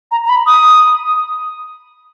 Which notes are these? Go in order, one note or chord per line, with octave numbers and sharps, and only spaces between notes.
A#5
A#5
B5
D#6